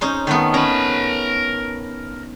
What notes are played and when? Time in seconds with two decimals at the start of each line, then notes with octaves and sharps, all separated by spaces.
0.01 C#4 D#4 C5
0.27 D#3 A3 B3
0.54 C#4 A#4 B5